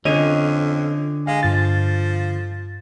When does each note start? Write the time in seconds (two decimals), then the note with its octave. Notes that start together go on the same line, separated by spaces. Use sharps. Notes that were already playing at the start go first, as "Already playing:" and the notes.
0.05 F2 D3 C#4 D#5 D#7
1.27 G#3 F5
1.43 G2 F3 A6